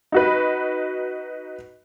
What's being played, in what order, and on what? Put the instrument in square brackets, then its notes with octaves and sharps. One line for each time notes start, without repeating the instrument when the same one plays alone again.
[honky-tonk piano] D#4 F#4 B4